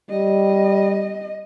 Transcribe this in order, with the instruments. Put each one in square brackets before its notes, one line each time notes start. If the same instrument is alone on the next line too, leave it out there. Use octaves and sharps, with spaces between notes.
[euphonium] G3 [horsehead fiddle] D#5